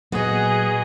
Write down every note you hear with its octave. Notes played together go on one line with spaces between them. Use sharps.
A#2 F#3 B3 F#4 G#4 D#5